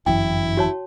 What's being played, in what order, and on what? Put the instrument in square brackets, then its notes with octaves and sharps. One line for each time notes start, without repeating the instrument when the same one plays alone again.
[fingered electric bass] G1 F#2 E3 [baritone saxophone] E4 [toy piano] G5
[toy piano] F#4 C#5 A5